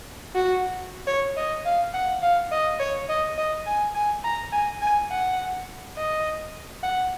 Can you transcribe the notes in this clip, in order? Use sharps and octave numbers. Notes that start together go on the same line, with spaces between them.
F#4
C#5
D#5
F5
F#5
F5
D#5
C#5
D#5
D#5
G#5
G#5
A#5
G#5
G#5
F#5
D#5
F#5